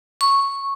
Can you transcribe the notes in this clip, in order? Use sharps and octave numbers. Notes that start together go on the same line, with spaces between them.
C#6